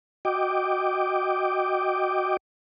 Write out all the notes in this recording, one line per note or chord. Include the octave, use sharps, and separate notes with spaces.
F#4 D#5 G5 D6